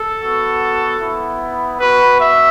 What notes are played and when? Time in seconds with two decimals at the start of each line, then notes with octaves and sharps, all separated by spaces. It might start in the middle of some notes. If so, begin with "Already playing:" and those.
Already playing: A4
0.19 B3 F#4
0.99 B3 E4
1.79 B3 F#4 B4
2.20 E5